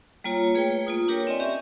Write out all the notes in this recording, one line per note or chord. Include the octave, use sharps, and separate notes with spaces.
G3 A#3 F4 C#5 A#5
A3 G#4 B4 C#5 G5
A#3 F4 D#6
D4 G4 A#4 B4 C#5 G5
C4 D5 D#5 G#5 C6
C#4 G4 E5